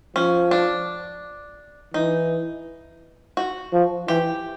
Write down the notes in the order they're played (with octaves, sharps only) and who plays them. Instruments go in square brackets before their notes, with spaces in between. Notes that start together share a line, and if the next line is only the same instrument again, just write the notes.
[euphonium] F3 [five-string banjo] C#4
[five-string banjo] D4
[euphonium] E3 [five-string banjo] D#4
[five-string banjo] F#4
[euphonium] F3
[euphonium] E3 [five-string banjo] G4